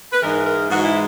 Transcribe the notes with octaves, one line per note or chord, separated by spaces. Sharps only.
B4
G#2 E3 G#3 A#4
A#4
G#2 E3 G#3 F#4
E4